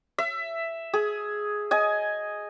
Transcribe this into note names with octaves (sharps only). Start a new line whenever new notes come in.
E5
G#4
D#5 G#5